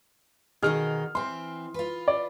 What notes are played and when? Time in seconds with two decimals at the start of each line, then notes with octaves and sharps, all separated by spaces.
0.62 B2 D#3 D#4 G#4 F6
1.15 E3 C4 C6
1.74 F4 B4
2.08 D5